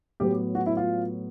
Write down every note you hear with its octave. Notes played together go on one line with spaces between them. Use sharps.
A2 F#3 B3 G4
F#4
E4
F4